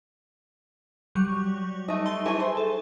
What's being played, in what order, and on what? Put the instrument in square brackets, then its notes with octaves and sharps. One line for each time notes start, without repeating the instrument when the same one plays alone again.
[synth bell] F#3 G3 C#6
[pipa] A3 D#5 [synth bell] D#4
[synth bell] A5 C6 G7
[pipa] E3 A3 [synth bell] G#4
[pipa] C5
[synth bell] A4